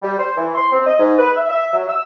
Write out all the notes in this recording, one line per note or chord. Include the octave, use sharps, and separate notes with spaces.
G3
C5
E3
C6
C4
D#5
G#2
B4
E5
E5
F#3
E6